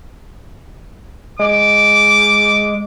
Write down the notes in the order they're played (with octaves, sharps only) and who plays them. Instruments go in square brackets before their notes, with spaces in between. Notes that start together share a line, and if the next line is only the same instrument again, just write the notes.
[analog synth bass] G#3 [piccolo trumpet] D6